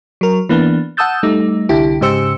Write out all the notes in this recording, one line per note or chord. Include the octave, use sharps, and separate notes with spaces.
F#3 A#4
E3 A#3 B3 D4
F#5 A5 D#6 E6 G6 A6
G3 A3 D#4
C2 D3 E4 G4
G#2 C#3 G4 C5 E6 C#7